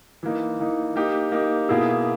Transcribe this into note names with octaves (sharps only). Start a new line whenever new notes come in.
E3 A#3 D#4
E3 A#3 D#4
A#3 D#4 G4
A#3 D#4 G4
B2 A#3 E4 G#4